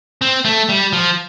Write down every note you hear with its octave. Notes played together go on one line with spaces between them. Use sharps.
C4
A3
G3
F3